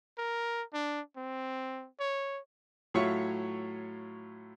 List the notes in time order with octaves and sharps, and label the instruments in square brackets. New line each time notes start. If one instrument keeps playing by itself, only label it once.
[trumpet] A#4
D4
C4
C#5
[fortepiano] A2 F#3 F4 C#5 E5 C#6